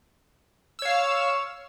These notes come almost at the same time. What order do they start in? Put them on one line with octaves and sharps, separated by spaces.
E6 C#5 F5